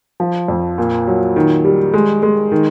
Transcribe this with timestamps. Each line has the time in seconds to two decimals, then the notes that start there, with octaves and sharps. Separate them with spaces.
0.20 F3
0.48 F2
0.78 A#2
1.07 F#3
1.36 D#3
1.65 G3
1.94 G#3
2.23 G#3
2.52 D#3